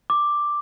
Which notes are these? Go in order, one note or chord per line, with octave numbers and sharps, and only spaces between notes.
D6